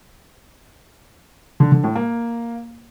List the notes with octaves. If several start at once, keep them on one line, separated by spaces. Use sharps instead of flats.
D3
D3
A2
A#3